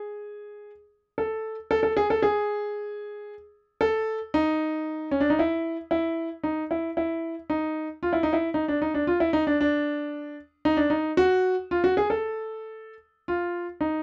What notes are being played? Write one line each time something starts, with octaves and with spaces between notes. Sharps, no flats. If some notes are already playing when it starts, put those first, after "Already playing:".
Already playing: G#4
A4
A4
A4
G#4
A4
G#4
A4
D#4
C#4
D4
D#4
E4
E4
D#4
E4
E4
D#4
F4
E4
D#4
E4
D#4
D4
D#4
D4
F4
E4
D#4
D4
D4
D#4
D4
D#4
F#4
F4
F#4
G#4
A4
F4
D#4